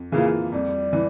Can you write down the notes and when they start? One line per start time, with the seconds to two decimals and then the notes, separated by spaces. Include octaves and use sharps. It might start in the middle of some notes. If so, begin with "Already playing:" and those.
Already playing: F2
0.12 C#3 E3 A#3 F4
0.52 F2 G3
0.93 E3